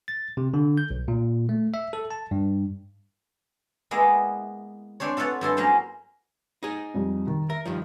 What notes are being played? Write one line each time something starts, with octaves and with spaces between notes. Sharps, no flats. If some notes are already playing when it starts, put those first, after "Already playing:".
A6
C3
D3
G6
B1
A#2
A3
E5
A4
A5
G2
G#3 A#3 B3 E4
C4 D4 C5 C#5
F4 A4 B4 C#5 F#5
G2 E4 A4 C6
F#3 A#3 C#4 C5
D#4 G#4
F2 G3
D#3
A#4 E5
G2 D#3 F3